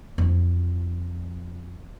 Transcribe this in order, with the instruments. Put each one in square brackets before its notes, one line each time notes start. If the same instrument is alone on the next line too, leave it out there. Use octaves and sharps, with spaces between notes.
[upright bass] F2 F3